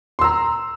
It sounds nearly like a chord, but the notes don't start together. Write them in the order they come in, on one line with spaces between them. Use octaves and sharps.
C6 E6 A#5